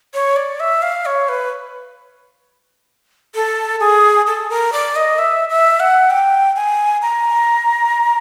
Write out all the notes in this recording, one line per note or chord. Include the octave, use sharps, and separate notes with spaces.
C#5
D5
E5
F5
C#5
B4
A4
G#4
A4
A#4
D5
D#5
E5
E5
F#5
G5
G#5
A#5